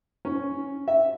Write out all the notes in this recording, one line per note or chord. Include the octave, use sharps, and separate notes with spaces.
C#4
E5